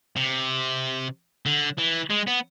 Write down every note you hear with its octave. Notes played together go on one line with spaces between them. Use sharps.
C3
D3
E3
G#3
B3